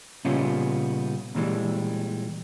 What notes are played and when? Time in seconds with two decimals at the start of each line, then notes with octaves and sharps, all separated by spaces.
0.25 A#2 C#3 G3 B3 C#4 F4
1.35 A#2 D3 E3 G3 G#3